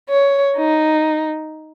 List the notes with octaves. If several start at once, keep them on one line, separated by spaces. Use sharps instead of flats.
C#5
D#4